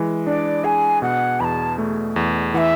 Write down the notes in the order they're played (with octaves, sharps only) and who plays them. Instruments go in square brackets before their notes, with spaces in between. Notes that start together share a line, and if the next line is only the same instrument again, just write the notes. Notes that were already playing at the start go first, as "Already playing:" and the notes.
Already playing: [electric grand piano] E3 G#3
[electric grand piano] D4 [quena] D5
[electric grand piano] G#4 [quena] G#5
[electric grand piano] B2 [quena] F#5
[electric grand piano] E2 [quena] A5 B5
[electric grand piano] A3
E2
[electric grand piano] E3 [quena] F#5
[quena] E5